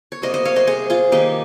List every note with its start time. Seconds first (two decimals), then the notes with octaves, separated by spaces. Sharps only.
0.12 C#5
0.22 C3 G3 A#3 C5 D#5
0.34 C5 D#5
0.45 C#5 F5
0.56 C5 D#5
0.67 G#4 C5
0.90 F4 G#4
1.12 D#3 A#3 D#4 G4